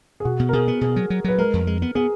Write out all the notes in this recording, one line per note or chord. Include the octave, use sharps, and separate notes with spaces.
G#4
B2 F#4
B2
A#4
B2 G#4
B3
B2 G#4
F#3
F#3
F#3 B4
G#3 A#4
F2
G#3
B3
B3 G#4